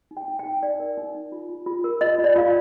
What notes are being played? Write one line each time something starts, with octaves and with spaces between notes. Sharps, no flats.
D#4
G5
D#4
G5
D#4
D#4 D5
A#4
D#4
D#4
F4
F4
F4
A#4
F4 D#5
F4
D5
F4 F5